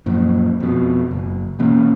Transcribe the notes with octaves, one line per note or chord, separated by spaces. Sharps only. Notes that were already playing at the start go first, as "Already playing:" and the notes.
F#2 A#2 F3
F2 B2
F#1
B2 E3 A#3 C#4